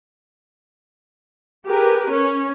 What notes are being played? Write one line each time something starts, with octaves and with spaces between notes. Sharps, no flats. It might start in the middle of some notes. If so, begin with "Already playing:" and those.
G4 G#4 A#4 B4
C#4